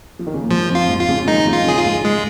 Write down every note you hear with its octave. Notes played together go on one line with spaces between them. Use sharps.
F3
D#3
C#3
A#2
G#2 F3
F2
F4
G#2
F4
C#3 F3
D#3 G#3 D#4
C#3 F3
F4
C#3 F3 G#4
F4
G#2
G#3